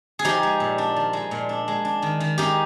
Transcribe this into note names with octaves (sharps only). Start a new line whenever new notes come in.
G#4
F3 D#4 G4
G#3
A#2
D4
F3
G#3
A#2
D4
G#3
D4
D#3
D#3
G#3 D#4 G4